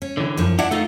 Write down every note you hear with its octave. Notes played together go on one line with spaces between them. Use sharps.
C#4
D3 E3
F#2 F3
D4 E4 F#5
A3 D#4 F4 D#5